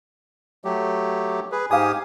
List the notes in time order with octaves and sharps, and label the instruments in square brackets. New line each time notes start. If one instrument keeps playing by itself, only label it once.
[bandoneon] F#3 A3 G4
G#4 B4
[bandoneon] G#2 G4 D#6 [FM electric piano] F5 G#5